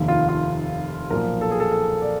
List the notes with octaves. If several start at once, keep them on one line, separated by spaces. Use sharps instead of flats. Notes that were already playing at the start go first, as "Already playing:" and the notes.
Already playing: F1 D#2 D#3
F4
F4
B1 A#2 F3 A#4
A4
G#4
A4
A4
D5